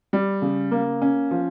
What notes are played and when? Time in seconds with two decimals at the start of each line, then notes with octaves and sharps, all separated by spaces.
0.13 G3
0.42 C#3
0.71 A#3
1.02 C#4
1.31 F3